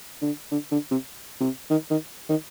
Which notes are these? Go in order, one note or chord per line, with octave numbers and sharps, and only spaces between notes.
D3
D3
D3
C3
C3
D#3
D#3
D#3